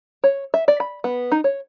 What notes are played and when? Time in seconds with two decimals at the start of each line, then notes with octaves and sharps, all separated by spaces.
0.24 C#5
0.54 E5
0.68 D5
0.80 B5
1.04 B3
1.32 D#4
1.44 C#5